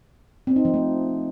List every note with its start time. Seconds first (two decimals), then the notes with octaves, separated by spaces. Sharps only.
0.47 C4
0.56 D#4
0.65 F3
0.74 A3